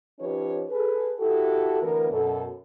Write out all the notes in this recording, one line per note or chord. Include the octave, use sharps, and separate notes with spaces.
F3 C#4 D#4 G4 B4 C#5
G#4 A4 B4
E4 F#4 G4 A4
D2 E3 B3 A#4
F#2 B2 A4